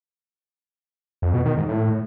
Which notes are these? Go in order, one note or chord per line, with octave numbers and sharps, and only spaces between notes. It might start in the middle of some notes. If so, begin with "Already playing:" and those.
F2
B2
D#3
G#2
A2